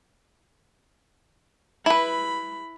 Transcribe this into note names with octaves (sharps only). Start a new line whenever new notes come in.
E4 B4 B5